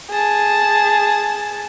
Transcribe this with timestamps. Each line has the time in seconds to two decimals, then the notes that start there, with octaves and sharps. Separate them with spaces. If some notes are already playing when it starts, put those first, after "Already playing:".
0.10 G#4 A5